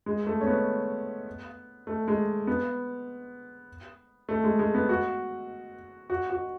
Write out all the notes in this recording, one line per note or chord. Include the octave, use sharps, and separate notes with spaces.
G#3
A3
C#4
B3
A3
G#3
B3
A3
G#3
G#3
B3
F#4
F#4
F#4